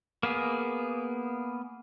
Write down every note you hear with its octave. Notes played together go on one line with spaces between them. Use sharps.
A#3 B3 G#4